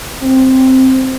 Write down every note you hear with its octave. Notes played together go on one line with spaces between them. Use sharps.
C4